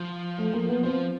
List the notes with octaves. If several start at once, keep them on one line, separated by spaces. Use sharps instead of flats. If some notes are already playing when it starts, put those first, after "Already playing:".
Already playing: F3
A3
A#3
B3
F3 C4